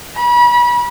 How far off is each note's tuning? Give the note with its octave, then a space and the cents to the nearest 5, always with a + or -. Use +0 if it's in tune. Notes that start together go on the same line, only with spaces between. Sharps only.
B5 -35